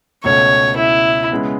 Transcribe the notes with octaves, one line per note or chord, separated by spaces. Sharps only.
C#2 B2 A3 C#4 C#5
E4
C#3 G#3 B3 E4